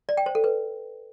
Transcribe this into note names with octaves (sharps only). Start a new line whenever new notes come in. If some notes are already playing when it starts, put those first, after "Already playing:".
D5
G5
C5
A4
B4